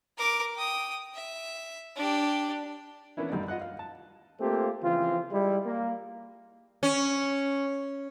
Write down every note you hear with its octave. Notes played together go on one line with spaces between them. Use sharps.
A#4 D6
G5 D#6
E5
D4 G4
E3 A#3 B3 C#4 D4 E4
A1 F#2 G3 D#4 D5
F4 D#5 F#5 F#6
F5
A5
A3 A#3 C4 F4 G4 C5
C#3 E3 F3 C4 F4
G3 G#3 E4
A#3
C#4